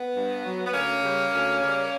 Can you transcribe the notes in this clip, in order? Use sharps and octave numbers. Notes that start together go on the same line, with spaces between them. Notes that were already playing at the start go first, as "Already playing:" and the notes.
Already playing: B3
G2
F#3
B3
D2 A#3 C#4
C#3 G3
D2
C#3 G3